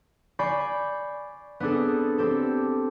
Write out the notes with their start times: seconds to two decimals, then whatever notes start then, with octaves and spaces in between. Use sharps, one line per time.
0.39 D5 G#5 B5 C#6 G6 C7
1.60 B3 C4 D4 G#4 A4
2.18 C4 G4 A4